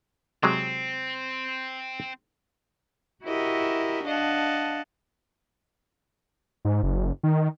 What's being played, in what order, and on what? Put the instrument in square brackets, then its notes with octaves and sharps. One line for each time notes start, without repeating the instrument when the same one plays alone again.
[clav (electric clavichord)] C3 F#3 G#3 [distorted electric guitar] C4
[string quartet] E4 F#4 G4 A#4 D#5 E5
D4 D#5 F5 F#5 A5
[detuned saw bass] G#2
F#1
D#3